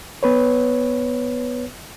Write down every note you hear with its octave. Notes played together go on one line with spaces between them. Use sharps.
B3 B4 C#5